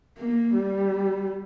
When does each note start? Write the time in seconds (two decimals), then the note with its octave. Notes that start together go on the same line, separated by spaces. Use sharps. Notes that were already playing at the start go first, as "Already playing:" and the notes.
0.18 A#3
0.54 G3